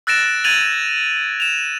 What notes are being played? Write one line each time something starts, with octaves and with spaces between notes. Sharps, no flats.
E6 F#6 A6 A#6 D7 E7
G#6 A6 D#7 F7 F#7
E7 F7